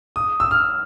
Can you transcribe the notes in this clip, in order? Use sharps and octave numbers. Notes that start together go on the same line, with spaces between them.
D#6
E6
F6